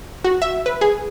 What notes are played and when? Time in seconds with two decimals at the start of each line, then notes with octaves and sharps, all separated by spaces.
0.24 F#4
0.42 E5
0.66 B4
0.81 G#4